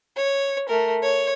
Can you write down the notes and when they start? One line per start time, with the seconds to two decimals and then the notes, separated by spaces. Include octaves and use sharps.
0.16 C#5
0.69 A3 A#4
1.03 C#5